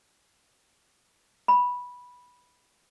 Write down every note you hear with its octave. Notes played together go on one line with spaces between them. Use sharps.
B5